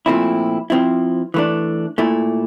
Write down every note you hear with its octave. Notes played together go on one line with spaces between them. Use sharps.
A#2 F3 A3 C4 E4
F3 C4 E4
E3 A3 D4
A#2 A3 E4